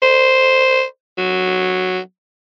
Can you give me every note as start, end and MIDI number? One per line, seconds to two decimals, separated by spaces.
0.02 0.83 72
1.18 1.99 54